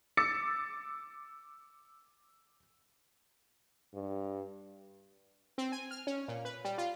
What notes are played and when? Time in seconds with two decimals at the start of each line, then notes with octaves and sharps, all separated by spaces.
0.17 D6 E6 A6 C#7
3.94 G2
5.58 C4
5.72 G#5
5.91 F6
6.07 C#4
6.28 A#2
6.45 B4
6.65 G3
6.78 F4